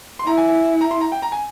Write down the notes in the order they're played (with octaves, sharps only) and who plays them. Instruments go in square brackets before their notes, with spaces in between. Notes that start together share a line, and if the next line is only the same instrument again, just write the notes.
[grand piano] C6
[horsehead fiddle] E4 [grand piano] A#5
[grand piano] G#5
G#5
A#5
C6
A#5
G5
A#5
G#5